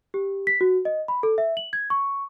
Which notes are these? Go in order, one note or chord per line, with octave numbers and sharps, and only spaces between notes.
G4
B6
F#4
D#5
B5
A4
E5
F#7
G#6
C#6